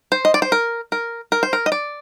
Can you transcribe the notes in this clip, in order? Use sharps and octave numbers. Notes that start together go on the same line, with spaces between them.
C5
D#5
D5
C5
A#4
A#4
A#4
C5
A#4
D#5
D5